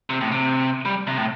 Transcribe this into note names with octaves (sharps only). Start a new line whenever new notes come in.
C3
A2
C3
G3
C3
A2